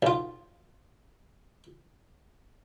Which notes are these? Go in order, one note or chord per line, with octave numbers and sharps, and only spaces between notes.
B1 F4